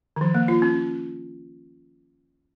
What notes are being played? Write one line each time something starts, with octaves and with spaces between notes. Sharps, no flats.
D#3
F3
A#3
F4
C#4